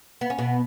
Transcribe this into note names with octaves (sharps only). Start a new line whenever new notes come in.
B3
C#4
B2 B3